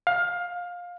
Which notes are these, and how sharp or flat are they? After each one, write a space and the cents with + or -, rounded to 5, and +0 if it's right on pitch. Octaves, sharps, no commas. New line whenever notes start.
F5 +20